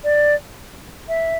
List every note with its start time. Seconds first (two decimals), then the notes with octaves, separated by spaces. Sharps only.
0.04 D5
1.08 E5